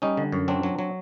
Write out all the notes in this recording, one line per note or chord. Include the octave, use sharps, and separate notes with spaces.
G3 C#4 D#4
D3
F#2
F#3 C4 D4
F#3
F#3